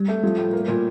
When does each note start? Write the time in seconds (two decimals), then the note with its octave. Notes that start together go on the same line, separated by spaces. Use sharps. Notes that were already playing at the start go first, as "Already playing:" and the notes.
Already playing: G3
0.08 A3
0.23 F3 G3
0.37 A2
0.53 A#3
0.68 A#2